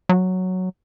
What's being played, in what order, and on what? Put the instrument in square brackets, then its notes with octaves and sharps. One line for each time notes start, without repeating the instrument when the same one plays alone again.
[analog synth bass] F#3